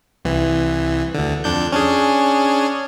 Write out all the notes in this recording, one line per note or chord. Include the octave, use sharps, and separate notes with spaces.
C2 E3
D2 D3
F2 D4 G6
C#4 D4 G#4